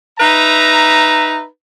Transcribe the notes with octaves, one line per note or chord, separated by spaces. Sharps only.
D#4 B4 E5 A#5